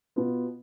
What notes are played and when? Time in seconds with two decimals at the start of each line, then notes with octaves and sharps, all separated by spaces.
0.16 B2 B3 F4